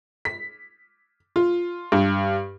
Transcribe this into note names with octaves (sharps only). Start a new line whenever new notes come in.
B6
F4
G2